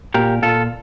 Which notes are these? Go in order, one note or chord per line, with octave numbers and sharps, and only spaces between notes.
A#2 G4 A#4
A#2 F4 A4